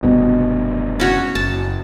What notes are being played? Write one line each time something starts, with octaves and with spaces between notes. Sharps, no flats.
F1 G2 B2
C#4 F#4 C#5
F#1 A5